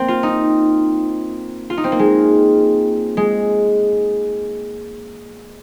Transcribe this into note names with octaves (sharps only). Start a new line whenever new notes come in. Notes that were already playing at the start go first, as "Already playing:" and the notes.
Already playing: A#3 C4
F4
D#4
F4
D#4
C4
A#3
G#3
G#3